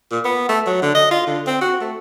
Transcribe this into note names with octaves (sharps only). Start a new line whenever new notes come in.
A#2
B3
A3
F#3
D3
D#5
F4
D3
C4
F#4
A3